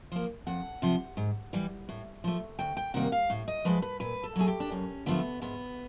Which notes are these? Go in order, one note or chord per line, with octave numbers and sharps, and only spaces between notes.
F3 A#3
F2 F#5
C3 F3
G#2
E3 G3
A2
F3 A3
D2 G5
G5
C3 D#3 G3 A#3 F#5
F5
A2
D#5
F3 G#3 B4
B4
A#2 B4
A4
F#3 A3 G#4
G4
D4
F#2 C#4
D3 F3 A3 B3
G#2 B3